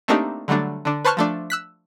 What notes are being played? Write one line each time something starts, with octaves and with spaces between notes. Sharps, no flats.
A3 A#3 C4 D4 D#4 G4
D3 F#3 G3 A3 D4
D3 D4
B4 C5 A5 C#6 F6 F#6
F3 A3 D4
E6 F#6 B6